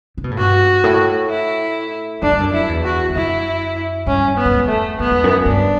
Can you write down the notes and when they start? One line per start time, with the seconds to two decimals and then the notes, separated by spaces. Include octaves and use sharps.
0.17 C#3
0.24 B2
0.31 A2
0.38 G2 F#4
0.84 A2
1.30 E4
2.22 F#2 D4
2.32 G2
2.40 F#2
2.54 E4
2.69 E2
2.84 F#4
3.09 E2
3.15 F#2 E4
4.06 G2 C#4
4.38 B3
4.45 F#2
4.54 E2
4.68 A3
4.99 F#2 B3
5.11 E2
5.24 F#2
5.45 G2 D4